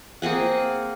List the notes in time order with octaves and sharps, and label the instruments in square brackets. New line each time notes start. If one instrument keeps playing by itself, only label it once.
[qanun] A#3 C4 G#4 F#5